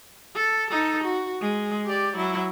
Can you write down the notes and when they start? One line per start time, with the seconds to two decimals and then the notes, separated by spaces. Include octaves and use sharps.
0.35 A4
0.70 D#4 A4
1.04 F#4
1.41 G#3
1.86 G4 D5
2.17 F#3 E4